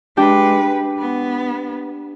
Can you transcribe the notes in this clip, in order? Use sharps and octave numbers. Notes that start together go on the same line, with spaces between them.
G#3 D4 G4 B4 G5
B3